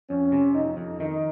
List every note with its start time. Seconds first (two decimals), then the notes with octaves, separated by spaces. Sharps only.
0.10 F2 C#4
0.32 C3
0.55 F2 D#4
0.77 F2
1.00 D#3 D#4